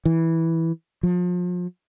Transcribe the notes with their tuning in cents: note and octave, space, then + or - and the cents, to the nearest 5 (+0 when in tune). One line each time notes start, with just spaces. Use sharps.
E3 -10
F3 +35